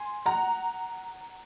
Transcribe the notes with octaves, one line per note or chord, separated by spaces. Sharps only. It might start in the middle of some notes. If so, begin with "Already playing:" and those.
Already playing: G#5 C6
F#5 A#5